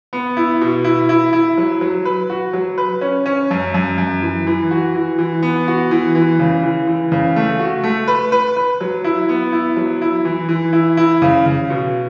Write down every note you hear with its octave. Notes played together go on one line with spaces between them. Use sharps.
B3
E4
B2
E4
E4
E4
F#3
F#3
B4
F#4
F#3
B4
C#4
C#4
F#2
F#2
F#2
E3
E3
F#4
E3
E3
B3
F#4
E3
E3
C#3
E3
E3
C#3
A3
F#4
A3
B4
B4
B4
F#3
E4
B3
E4
F#3
E4
E3
E3
E4
E4
C#3
C#3
B2